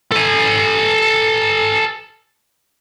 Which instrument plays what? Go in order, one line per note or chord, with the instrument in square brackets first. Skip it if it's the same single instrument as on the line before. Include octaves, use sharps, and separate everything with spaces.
[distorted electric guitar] A4 G#5